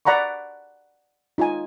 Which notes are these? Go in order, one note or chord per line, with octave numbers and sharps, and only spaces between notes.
D5 F#5 A#5 B5 C#6
D#4 F4 D#5 G#5